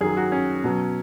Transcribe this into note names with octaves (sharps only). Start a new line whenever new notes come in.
F#2 D#3 F#3 G#4
F#4
C#4
B2 F#3